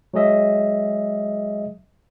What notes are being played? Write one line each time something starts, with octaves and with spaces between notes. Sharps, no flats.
F#3 G#3 G#4 D#5 E5